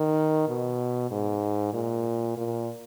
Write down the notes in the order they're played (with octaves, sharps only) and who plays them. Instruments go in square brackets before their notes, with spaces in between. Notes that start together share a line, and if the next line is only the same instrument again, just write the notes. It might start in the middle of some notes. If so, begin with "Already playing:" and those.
Already playing: [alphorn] D#3
B2
G#2
A#2
A#2